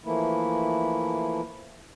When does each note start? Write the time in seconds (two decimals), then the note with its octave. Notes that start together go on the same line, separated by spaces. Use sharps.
0.05 E3 F3 A3 A#3 E4